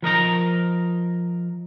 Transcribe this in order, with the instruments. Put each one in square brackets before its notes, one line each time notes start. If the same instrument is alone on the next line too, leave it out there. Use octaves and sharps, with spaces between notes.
[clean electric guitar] F3 A#4 D#5 A#5